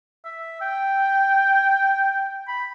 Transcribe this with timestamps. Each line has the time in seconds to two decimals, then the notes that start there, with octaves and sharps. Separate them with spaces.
0.25 E5
0.61 G5
2.48 B5